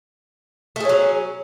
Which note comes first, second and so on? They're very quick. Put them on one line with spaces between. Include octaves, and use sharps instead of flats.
A3 G#4 C#4 F#3